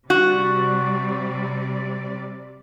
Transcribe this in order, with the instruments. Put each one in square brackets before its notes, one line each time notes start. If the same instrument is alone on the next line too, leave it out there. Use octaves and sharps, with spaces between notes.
[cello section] C3 G3 D5 [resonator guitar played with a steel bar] F#4